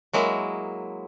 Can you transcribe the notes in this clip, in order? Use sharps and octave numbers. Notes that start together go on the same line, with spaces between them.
F#3 G#3 A#3 E4